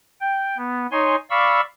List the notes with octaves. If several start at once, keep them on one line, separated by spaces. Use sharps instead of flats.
G5
B3
D#4 C#5 G#5 C6
D5 F5 B5 C#6 E6